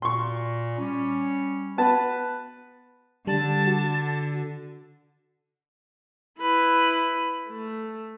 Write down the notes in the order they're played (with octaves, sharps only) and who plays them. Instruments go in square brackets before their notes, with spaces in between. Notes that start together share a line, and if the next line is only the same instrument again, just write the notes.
[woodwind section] A#2 [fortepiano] C6 C#6
[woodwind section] G3 C#4
[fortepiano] B3 A5 [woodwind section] B4
[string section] D3 [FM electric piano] G3 [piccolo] A5
[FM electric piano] F#4
[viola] E4 B4
A3